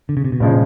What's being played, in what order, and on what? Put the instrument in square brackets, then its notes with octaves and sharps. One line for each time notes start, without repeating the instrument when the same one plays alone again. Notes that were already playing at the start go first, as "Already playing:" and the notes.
[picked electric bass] D3
C#3
C3
B2
[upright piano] G1 C#3 F3 G#3 [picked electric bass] A#2